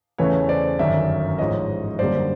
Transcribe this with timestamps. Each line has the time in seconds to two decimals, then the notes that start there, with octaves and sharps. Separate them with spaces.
0.18 E2 C#3 E3 A3 B4 C#5
0.49 C5 D5
0.79 G1 F#2 D#3 D5 E5
1.39 A1 G#2 F3 C#5 D#5
1.99 F#2 D3 G3 A#3 C5 D5